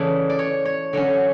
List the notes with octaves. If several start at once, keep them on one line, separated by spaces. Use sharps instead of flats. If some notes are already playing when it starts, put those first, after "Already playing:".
Already playing: C#3 E3 A3 D5
D5
C#5
C#5
D3 F#3 C#4